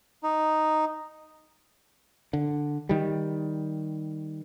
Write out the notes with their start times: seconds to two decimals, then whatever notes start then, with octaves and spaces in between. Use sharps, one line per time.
0.23 D#4
2.33 D3
2.89 D#3 G3